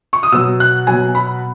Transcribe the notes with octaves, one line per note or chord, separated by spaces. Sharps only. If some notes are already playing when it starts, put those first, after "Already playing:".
C#6
D#6
B2 F#3 E6
F#6
B2 F#3 G#5
B5